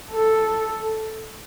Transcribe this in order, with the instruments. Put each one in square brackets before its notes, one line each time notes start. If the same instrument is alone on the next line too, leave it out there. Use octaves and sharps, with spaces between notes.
[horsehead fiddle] A4